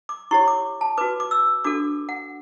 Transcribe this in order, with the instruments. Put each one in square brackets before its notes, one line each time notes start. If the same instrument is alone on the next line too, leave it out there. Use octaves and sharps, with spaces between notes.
[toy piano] D6
E4 G4 C#5 C#6
D6
A5
F#4 B4 D6
D6
E6
D4 F#4 A4 D6
F#5